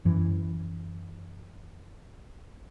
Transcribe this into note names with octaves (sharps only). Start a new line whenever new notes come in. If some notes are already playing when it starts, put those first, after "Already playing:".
F#2 E3